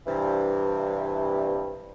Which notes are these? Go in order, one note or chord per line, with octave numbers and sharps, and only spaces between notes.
G2 C3 E3